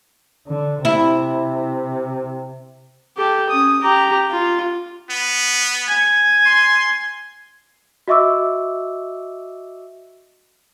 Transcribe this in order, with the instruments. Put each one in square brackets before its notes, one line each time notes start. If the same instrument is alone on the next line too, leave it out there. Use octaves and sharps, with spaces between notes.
[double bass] D3
[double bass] C3 [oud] E4
[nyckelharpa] G4 A4
C#4 D#6
G4 A#5
F4
[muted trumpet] B3
[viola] G#5
[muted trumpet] C6
[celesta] F#4 D#5 E5 C#6 D6 E6